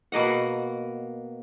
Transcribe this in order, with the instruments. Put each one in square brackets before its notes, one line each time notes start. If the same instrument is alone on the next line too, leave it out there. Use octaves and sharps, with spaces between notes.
[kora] B2 A#3 D#5 F#5